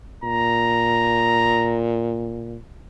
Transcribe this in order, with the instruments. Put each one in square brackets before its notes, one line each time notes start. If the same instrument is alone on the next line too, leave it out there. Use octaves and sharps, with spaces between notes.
[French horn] A#2 [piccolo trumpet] A#5